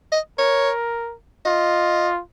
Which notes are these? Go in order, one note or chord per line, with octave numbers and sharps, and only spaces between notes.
D#5
A#4 C#5
F4 D#5